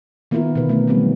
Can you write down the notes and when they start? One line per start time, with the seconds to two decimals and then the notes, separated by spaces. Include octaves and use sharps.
0.31 D#3 A#3 B3 E4 F4 A#4
0.55 B2 D3 A#3 B4
0.69 A3 C#4 D4
0.87 D#3 F#3 G3 A3 B3 C4